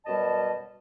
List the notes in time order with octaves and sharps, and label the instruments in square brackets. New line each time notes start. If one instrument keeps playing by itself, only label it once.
[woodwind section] F#2 B2 G3 D#5 A5